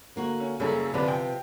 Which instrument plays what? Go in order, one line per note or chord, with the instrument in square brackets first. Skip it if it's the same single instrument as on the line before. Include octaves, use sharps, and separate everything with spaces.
[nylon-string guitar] D3 A#3 F#4
[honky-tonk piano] C#4
[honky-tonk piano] F#2 G3 A4 [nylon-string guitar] C#3 A#3 E4
[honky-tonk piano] G1 B4 D5 [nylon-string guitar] C3 F3 B3
[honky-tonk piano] G5